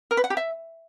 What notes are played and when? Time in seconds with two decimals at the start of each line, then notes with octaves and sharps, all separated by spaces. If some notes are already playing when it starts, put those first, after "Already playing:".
0.11 A#4
0.17 B4
0.24 F#5
0.30 G4
0.37 E5